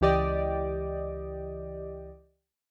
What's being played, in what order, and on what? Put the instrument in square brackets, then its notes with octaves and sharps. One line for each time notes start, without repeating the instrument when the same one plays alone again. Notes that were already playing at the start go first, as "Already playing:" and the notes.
[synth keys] C#2 E3 G4 D5 D#5